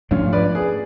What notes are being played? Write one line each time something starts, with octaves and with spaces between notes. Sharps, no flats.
G#2 F3 A3 C#4 D4 F4
B4 D5
G#4 B4